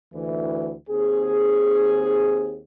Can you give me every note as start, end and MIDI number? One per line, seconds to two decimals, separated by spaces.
0.14 0.74 38
0.14 0.74 52
0.90 2.61 39
0.90 2.61 60
0.90 2.61 68